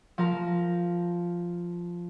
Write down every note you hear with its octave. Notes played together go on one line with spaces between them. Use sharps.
F3 A#4